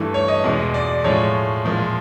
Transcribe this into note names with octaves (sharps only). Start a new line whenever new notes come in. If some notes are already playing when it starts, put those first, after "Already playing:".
Already playing: G2 E3 A3
C#5
D#5
E2 B2 G#3
D5
A2 F3 G#3 C#5
A#2 F3 G#3